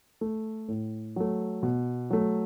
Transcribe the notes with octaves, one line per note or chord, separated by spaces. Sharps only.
A3
A2
F#3 A3
B2
F#3 A3